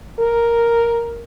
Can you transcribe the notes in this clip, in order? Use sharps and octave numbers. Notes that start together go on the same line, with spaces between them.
A#4